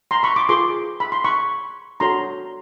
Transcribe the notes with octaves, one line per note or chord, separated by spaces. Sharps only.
A#5 C6
B5 C#6
C6 D6
F4 G#4 B4 C6 D6
B5
C6
B5 C#6
D4 F#4 A4 C#5 A#5 C6